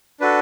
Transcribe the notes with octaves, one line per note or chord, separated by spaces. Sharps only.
D4 F#4 A4 B4